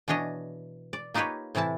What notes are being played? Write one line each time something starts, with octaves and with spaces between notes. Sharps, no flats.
B2 E3 D4 C#5 D#5
D5
A#3 D#4 F4 G4 B4 C#5
A2 C3 E3 E4 A5